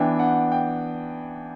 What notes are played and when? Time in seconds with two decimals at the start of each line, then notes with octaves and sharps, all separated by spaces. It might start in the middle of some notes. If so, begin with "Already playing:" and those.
Already playing: E3 B3 D4 G5
0.19 F#5
0.52 G5